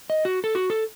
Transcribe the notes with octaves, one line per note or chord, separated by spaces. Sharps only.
D#5
F#4
A4
F#4
A4